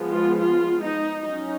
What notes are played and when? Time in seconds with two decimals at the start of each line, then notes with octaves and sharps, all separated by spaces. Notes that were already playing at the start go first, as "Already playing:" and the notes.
Already playing: F3 G#3 B3
0.10 F4
0.39 F4
0.81 D#4
1.23 F#3 C#4 D#4